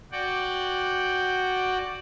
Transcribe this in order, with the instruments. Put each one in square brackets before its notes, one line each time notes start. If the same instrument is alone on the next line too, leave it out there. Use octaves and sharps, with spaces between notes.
[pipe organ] F#4 D5 F#5 G5